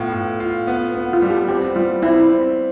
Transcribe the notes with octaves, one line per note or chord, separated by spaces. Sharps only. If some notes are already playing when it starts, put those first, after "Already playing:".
Already playing: A2 B3 F4
A2
F4
B3
B3
F4
G3
G4
C4 G4
G3 F4
C4 E4
C4